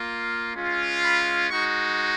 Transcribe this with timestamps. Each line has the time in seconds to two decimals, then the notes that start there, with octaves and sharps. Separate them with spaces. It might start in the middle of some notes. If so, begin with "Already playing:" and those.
Already playing: A#3 F4
0.54 G#3 C#4 F4
1.03 B5
1.51 G#3 D#4 F#4 C#6